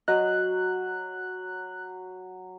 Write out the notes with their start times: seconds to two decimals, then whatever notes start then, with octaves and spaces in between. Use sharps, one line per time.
0.08 F#3 D#5 F#6